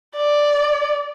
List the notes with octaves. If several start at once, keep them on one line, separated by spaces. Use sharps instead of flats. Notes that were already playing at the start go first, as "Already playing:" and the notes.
D5